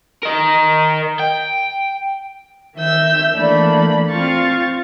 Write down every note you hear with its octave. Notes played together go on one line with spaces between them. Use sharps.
A#4 D#5
G5
D#3 E5 E6 G6
E3 A3 A#3 D4 B5
C4 F4 F5 C#6 A6